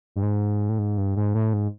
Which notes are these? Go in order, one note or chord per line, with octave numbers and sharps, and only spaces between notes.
G2
G#2
A2
G#2
G2
G#2
A2
G#2